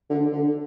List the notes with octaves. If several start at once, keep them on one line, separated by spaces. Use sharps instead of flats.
D3
D3